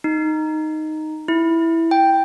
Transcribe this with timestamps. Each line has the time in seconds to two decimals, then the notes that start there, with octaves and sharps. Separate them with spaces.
0.04 D#4
1.28 E4
1.91 G5